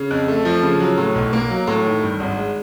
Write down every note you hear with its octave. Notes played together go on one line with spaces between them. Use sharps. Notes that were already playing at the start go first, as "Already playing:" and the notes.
Already playing: C#3
F2
A3
F3
C#3
F#3
A2
B1
A#3
F#3
A2
D#3
G2
G#1
G#3